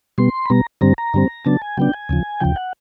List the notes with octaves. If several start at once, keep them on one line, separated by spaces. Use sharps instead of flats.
B2 G3 B3 C6
B5
B2 G3 B3 A#5
G2 D3 G3 C4 A#5
A#5
G2 D3 G3 C4
C#3 F#3 B3 D4 A5
G#5
C#3 F#3 B3 D4 G5
G#5
D#2 C#3 F3
D#2 C#3 F3 G5
F#5